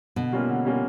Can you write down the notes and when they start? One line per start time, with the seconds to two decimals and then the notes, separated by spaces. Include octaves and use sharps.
0.16 B2 D3
0.32 G3 A#3 C#4 F4
0.49 D3
0.65 G3 A#3 C#4 F4